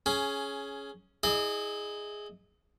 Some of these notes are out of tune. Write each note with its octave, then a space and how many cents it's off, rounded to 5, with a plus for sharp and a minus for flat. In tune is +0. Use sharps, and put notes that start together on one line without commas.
C#4 +0 G#4 +15
E4 -30 G#4 +0 D#5 -35